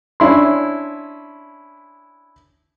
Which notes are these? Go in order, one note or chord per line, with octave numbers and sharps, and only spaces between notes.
C#4 D4 E4 C6